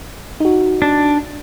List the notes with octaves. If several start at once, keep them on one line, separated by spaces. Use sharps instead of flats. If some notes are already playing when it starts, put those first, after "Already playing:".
D#4 F#4
D4